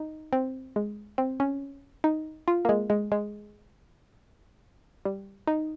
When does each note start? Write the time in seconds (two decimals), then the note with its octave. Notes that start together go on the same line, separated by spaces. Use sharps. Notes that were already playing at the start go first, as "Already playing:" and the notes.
Already playing: D#4
0.33 C4
0.76 G#3
1.18 C4
1.40 C#4
2.04 D#4
2.48 F4
2.65 A#3
2.69 G#3
2.90 G#3
3.12 G#3
5.05 G3
5.47 D#4